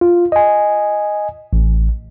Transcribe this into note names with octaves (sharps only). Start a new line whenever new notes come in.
F4
D#5 G#5
A1